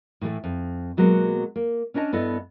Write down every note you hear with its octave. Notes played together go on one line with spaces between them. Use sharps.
A2 E3 G3 A3
F2
B2 F#3 G#3 A#3 B3
A#3
C#4 D4 C#5 D#5 A5
G2 B3 E4 A4 D#5